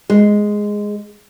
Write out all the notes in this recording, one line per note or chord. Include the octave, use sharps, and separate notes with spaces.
G#3